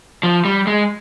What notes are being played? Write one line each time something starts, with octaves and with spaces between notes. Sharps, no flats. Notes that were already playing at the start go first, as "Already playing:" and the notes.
F3
G3
G#3